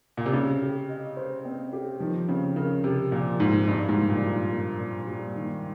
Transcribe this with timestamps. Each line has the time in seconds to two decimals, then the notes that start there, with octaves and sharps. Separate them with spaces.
0.17 A#2
0.26 C3
0.33 C#3 C4
0.62 G4
0.89 D#5
1.17 C5
1.45 C4
1.73 G4
2.00 D#3 F3
2.28 C#3 C4
2.56 C#3 A#4
2.84 C3 G4
3.12 A#2 F3
3.40 G#2 C4
3.67 G2 A#2
3.89 G#2
3.96 G3
4.09 A#2
4.23 F4
4.51 A#3
4.79 A#2
5.07 G3
5.35 D#3